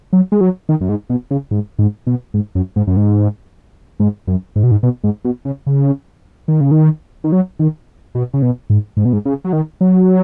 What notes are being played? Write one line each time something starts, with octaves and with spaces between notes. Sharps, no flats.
F#3
G#3
F#3
D#3
F#2
G#2
B2
C#3
G#2
G#2
B2
G#2
F#2
G#2
F#2
G#2
G#2
F#2
G#2
B2
G#2
B2
G#2
B2
C#3
C#3
D#3
C#3
D#3
D#3
F#3
D#3
B2
C#3
B2
G#2
G#2
B2
G#2
C#3
F#3
D#3
F#3